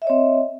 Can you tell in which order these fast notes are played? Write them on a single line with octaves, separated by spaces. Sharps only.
E5 D#5 C#5 C4